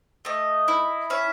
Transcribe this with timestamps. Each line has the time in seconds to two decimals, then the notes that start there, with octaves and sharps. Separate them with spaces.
0.25 A3 D#5
0.68 E4
1.10 C#4 E5